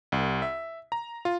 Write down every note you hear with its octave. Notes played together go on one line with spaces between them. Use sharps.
C2
E5
A#5
F4